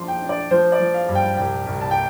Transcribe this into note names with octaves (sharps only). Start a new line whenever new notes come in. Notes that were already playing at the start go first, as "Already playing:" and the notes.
Already playing: F3 D4 C6
G5
D4
D5
F3 C5
D5
F3
F5
G2
G5
C2 G5
C2
A5
G5